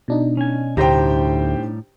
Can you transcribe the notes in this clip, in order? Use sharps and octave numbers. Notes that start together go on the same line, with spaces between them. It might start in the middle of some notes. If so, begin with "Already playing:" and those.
B2 D4 D#4
C#4 G#5
D2 A2 G3 G4 C5 G5 A#5